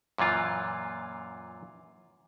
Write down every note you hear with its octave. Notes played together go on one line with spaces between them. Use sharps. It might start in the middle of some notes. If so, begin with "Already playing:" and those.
F#2 A#2 E3 F4